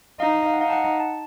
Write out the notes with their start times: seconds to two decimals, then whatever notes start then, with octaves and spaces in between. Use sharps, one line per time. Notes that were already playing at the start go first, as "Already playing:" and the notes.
0.20 D#4 F5
0.46 F5
0.53 F#5
0.61 D#4 F5
0.70 A5
0.73 F#5
1.00 A5